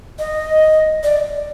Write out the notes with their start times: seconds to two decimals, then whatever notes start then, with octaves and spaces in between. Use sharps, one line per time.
0.19 D#5
1.04 D5